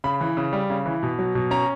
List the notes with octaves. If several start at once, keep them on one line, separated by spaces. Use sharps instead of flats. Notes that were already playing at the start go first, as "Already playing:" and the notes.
C#3 B5
E3
C#3
G3
C#3
E3
B2
F#3
B2
C#4 A#5